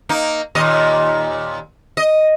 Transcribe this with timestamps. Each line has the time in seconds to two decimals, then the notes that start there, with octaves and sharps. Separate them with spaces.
0.09 A#3 D#4
0.55 D#2 A#2 D#5
1.97 D#5